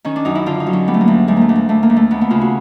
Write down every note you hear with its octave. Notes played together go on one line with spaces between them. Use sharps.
D#3 C#4
D4
F#2 D#4
E4
D3 F4
D#4
F#3
C#4
G3 B3
A3
A#3
D2
D2 G#3
A3 A#3
D2
A#3
D2 A3
A#3
D2
A3
D#2 B3
B3
C#3 F4
F#4